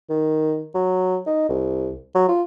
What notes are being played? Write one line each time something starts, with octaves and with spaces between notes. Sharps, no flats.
D#3
F#3
D#4
C2
F#3
F4